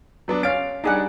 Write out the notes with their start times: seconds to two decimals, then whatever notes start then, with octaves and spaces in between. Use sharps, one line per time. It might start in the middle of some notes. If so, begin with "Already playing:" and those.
0.28 F#3 B3 D4
0.43 C#4 F5 A6 D7
0.84 G3 D4 D#4 G#4 F#5